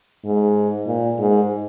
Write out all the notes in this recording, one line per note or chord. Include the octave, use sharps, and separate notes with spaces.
G#2
A#2
G#2